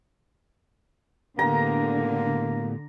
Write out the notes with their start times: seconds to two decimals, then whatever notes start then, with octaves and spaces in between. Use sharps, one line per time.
1.39 A2 D3 A#3 B3 G4 A#5